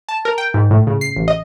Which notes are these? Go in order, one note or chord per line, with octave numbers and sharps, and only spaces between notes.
A5
A#4
G5
G#2
A2
C#3
C7
A1
D#5